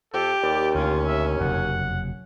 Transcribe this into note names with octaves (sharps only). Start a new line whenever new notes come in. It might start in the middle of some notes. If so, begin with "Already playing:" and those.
F2 G4 A4
D#2 D5
D2 C#4 F4
E5
F#1 F2 C3 F#5